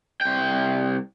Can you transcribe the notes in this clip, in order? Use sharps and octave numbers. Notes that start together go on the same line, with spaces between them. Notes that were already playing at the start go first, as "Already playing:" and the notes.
C2 G5